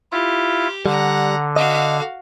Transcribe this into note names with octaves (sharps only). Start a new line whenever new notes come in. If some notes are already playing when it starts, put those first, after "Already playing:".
E4 F4 G4
D3 G3 F#5 A#5
F#4 D#5 F5